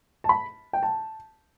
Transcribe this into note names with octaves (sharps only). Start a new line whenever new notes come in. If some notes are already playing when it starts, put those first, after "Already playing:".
A5
B5
G5
A5